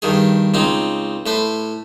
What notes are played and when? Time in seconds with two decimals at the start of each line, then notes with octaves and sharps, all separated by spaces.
0.02 G2 D#3 G#4
0.54 C#2 C4 D#4
1.26 A2 B4 C5